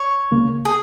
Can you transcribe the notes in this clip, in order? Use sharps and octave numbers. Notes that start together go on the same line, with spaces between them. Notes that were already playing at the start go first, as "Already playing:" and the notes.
Already playing: C#5
C#2 C#3 A#3
G#4